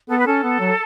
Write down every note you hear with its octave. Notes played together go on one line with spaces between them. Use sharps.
B3 A4
B4
C#4 A4
B3
F#3